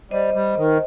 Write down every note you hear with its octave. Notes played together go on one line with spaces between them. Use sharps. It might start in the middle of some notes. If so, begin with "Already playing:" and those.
G3 C5 D#5
G3
D#3